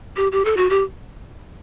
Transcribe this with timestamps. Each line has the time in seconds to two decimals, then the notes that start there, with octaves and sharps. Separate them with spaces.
0.16 G4
0.32 G4
0.45 A4
0.57 F#4
0.70 G4